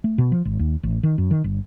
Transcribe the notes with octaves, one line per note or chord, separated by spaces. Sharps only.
A3
B2
F3
G#1
D#2
A1
D#3
F#2
D#3
G1